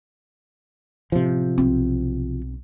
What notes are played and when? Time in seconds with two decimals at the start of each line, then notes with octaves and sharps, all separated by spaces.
1.12 A1 C3 F3
1.58 B1 C4